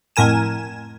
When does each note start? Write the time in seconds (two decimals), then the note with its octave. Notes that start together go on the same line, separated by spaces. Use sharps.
0.16 F2 A2 A#4 G#5 E7